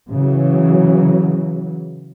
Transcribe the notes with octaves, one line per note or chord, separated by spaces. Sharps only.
C#3 E3 F#3